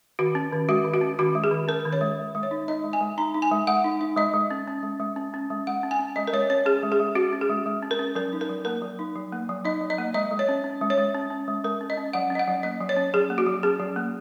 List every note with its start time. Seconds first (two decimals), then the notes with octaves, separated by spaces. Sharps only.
0.19 D#3 F#4
0.35 C#4
0.53 D#3
0.69 G#3 F#4
0.85 D#3
0.94 F#4
1.01 C#4
1.19 D#3 F#4
1.35 G#3
1.44 G#4
1.51 D#3
1.68 C#4 A#4
1.85 D#3
1.93 C#5
2.01 G#3
2.19 G#3
2.35 G#3
2.43 C#5
2.51 D#4
2.68 D#4 D#5
2.84 G#3
2.93 G#5
3.01 G#3
3.18 D#4 A#5
3.34 D#4
3.42 G#5
3.51 G#3
3.67 G#3 F#5
3.84 D#4
4.01 D#4
4.17 G#3 D#5
4.34 G#3
4.51 C#4
4.68 C#4
4.83 G#3
5.00 G#3
5.16 C#4
5.34 C#4
5.50 G#3
5.67 G#3 F#5
5.83 C#4
5.91 G#5
5.99 C#4
6.16 G#3 D#5
6.27 A#4
6.33 G#3 C#5
6.50 C#4 C#5
6.66 C#4 G#4
6.83 G#3
6.92 G#4
7.00 G#3
7.15 C#4 F#4
7.33 C#4
7.41 G#4
7.49 G#3
7.66 G#3
7.82 C#4
7.91 A#4
7.99 C#4
8.15 F#3 A#4
8.33 D#4
8.41 A#4
8.49 F#3
8.65 A#3 A#4
8.82 F#3
8.99 D#4
9.16 F#3
9.32 A#3
9.49 F#3
9.65 D#4 D#5
9.81 F#3
9.90 D#5
9.98 A#3
10.14 G#3 D#5
10.31 G#3
10.39 C#5
10.49 C#4
10.64 C#4
10.81 G#3
10.90 C#5
10.98 G#3
11.15 C#4
11.30 C#4
11.48 G#3
11.64 G#3 A#4
11.81 C#4
11.90 D#5
11.97 C#4
12.13 F#3 F#5
12.30 C#4
12.35 D#5
12.39 F#5
12.47 F#3
12.63 A#3 D#5
12.80 F#3
12.89 C#5
12.96 C#4
13.14 F#3 G#4
13.30 A#3
13.38 F#4
13.46 F#3
13.63 C#4 G#4
13.80 F#3
13.96 A#3